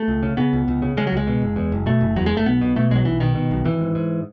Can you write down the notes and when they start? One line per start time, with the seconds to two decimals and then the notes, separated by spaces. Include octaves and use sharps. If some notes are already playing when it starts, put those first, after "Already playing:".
Already playing: A3
0.08 C#2
0.23 C#3
0.37 C#3 B3
0.53 C#2
0.68 C#2
0.82 C#3
0.97 C#3 G#3
1.07 F#3
1.12 C#2 G#3
1.27 B2
1.42 F#1
1.56 E2
1.72 F#1
1.86 B2 A3
2.01 F#1
2.16 E2 F#3
2.26 G#3
2.31 F#1
2.37 A3
2.46 B1 B3
2.61 B2
2.76 B2 A3
2.91 B1 G#3
2.96 F#3
3.05 B1 E3
3.20 B2 D#3
3.35 B2
3.51 B1
3.65 G#1 E3
3.80 G#2
3.95 G#2